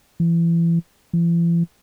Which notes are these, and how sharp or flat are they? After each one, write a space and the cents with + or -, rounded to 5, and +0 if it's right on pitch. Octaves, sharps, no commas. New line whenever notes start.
E3 +30
E3 +45